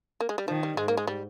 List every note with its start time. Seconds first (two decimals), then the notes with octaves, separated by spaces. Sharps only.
0.20 A#3
0.29 G#3
0.38 G3
0.48 D#3 F3
0.63 G3
0.77 G#2 G#3
0.88 A#3
0.97 G#3
1.07 G3